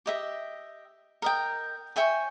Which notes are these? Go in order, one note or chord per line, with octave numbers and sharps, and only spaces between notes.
G4 D#5 E5
A#4 D#5 G5
C#5 E5 G5 G#5